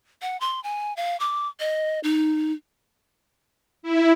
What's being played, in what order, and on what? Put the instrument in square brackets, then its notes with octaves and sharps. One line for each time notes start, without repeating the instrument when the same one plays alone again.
[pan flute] F#5
C6
G#5
F5
D6
D#5
D#4
[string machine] E4